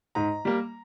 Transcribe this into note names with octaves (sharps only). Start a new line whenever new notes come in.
G#2 A#5
G3 A#3